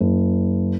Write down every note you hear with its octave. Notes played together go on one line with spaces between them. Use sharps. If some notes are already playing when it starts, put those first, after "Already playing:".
F#1